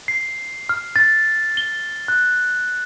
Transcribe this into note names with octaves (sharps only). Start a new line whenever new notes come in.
C7
F6
A6
G7
F#6